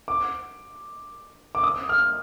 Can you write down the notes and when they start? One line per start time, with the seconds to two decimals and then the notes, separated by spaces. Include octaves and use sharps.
0.08 D6
1.55 D6
1.63 D#6
1.89 F6